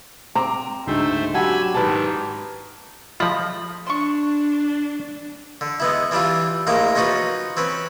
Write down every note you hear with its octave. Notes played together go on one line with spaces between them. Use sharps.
C4 A#5 D6
D2 G#2 A3 C5 E5
F#3 C#4 D4 G4 F#5 G#5 B5 E6
G#2 D#3 D#4 E4 G4 B4 A5
F3 A3 F4 D#5 B5
D4 C6 C#6
D3
G#3 B3 E4
E3 G3 D4 E4 F4
A#1 A2 G#3 A#3 A#5 D#6
C#4 D#4 F4 F#4 B4
C4 C#4 B4